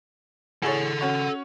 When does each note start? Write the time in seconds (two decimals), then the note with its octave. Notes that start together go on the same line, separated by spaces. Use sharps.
0.63 A2 G#4 A4 C#5 F#5
1.01 C#4 F#4 C#5